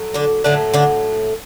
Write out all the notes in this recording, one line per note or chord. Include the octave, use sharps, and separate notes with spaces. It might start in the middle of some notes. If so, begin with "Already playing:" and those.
Already playing: A2 F#3 A3
D3 D4
A2 D3 F#3 A3 D4
D3 D4